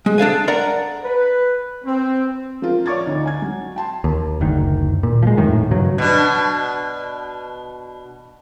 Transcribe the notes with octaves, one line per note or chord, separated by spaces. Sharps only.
G#3
D4 A4 F5 G#5
A#4 D5 F#5 A#5
B4
C4
F3 F4 A#4
C#5 D5 C#6 D6 G#6 A6
D2 D#4
G#5 G#6
F#3
G5 A5 C6
D#2
F#1 D2 D#3
A#2
F3 G#3
D#1 F2 A2 D#3
G2 C#3 F#3
B2 D4